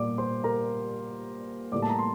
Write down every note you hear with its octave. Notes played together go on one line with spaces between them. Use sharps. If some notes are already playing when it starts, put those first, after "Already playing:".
Already playing: A#2 G3 A#3 D5 D6
C5 C6
A#4 A#5
A2 G3 A#3 D5 D6
A5
A#5
C6